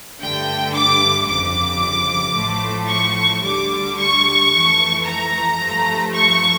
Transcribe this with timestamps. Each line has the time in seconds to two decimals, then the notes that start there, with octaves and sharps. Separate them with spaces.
0.20 G2 D3 A3 G5
0.74 D6
1.28 G1 F2 C#3 D6
2.36 A1 A2 F3 A3
2.90 C#6
3.44 D2 D3 G3 D6
3.98 C#6
4.51 F2 E3 A3
5.05 A#5
5.59 G2 F3 A3
6.14 C#6